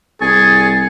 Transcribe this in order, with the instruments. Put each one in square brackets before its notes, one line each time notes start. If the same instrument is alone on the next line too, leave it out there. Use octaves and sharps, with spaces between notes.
[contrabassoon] C2 [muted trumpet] G#4 [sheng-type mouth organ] G#5 C#6 [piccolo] A6